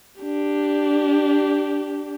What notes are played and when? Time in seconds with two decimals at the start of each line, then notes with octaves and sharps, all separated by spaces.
0.22 D4 G4